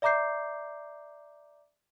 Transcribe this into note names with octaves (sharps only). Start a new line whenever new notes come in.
D5 E5 A#5 D6 G6 C7